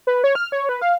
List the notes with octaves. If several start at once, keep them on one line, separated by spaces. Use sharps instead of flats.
B4
C#5
F6
C#5
B4
F5